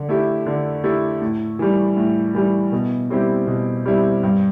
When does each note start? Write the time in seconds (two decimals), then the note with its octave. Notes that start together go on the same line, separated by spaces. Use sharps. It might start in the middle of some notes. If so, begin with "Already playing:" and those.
Already playing: D3
0.09 A3 E4 G4
0.46 D3
0.83 A3 E4 G4
1.22 A2
1.59 E3 G3
1.97 A2
2.35 E3 G3
2.72 B2
3.10 G3 C4 E4 G4
3.47 B2
3.86 G3 C4 E4 G4
4.23 G2